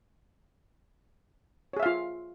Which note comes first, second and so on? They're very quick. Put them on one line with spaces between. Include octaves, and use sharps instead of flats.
C#5 G#4 E5 F5 F4